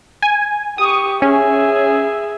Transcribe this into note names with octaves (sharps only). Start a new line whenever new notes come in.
G#5
G4 C#6 D#6
C#4 G#4 E5